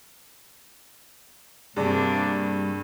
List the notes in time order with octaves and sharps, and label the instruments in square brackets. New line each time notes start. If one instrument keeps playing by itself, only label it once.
[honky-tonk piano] G2 [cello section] C3 A#3 D4 [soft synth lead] G3 [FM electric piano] G#4 D5